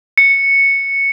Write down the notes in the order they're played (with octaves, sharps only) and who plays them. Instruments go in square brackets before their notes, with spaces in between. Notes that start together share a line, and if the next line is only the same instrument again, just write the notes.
[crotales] C#7